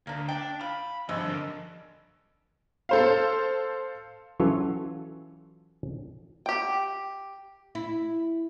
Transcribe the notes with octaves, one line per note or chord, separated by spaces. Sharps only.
D2 A#3 D4
D4 G5
F4 B5
G#1 G2 F3 G#3 E6
D3 F3 A#4
A4 C5 F5
E3 F#3 C#4 F4 A4 C#5
G4 G5
E4